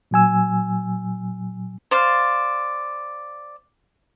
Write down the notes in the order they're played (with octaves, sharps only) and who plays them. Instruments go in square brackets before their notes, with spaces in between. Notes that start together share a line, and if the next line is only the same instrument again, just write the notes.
[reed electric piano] A#2 F#3 G#5 E6
[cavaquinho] C5 D5 F5